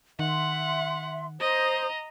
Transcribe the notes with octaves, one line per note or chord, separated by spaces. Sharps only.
D#3 E5 F#5 C6
C5 D#5 A#5 D#6